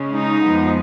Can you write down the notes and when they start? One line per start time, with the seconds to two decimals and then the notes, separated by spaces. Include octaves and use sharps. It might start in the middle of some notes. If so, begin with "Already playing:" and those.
Already playing: C#3 G#3 C#4
0.12 D#4
0.43 F2 F3 G#3 B3